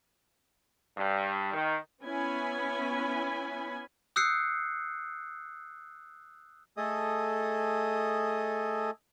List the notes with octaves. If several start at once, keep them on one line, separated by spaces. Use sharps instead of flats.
G2
D#3
B3 C#4 E4 G#5 B5
D#6 E6 F#6 G6 C7 C#7
A3 G#4 A4 D#5 D#6